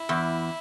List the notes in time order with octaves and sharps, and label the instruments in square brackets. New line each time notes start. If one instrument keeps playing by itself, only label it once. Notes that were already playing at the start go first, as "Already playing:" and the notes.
Already playing: [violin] E4
[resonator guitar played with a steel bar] E2